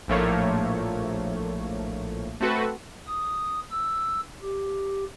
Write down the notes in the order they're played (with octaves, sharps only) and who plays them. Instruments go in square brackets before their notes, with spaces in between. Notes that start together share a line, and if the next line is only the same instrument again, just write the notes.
[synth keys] A#1 A2 F3 A3 A#3 C#5
A3 C4 F#4 A4 B4
[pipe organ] D#6
E6
G4